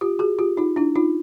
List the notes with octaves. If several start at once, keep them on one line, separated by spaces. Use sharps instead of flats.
F4 G4
F#4 G#4
F4 G4
D#4 F4
D4 E4
D#4 F4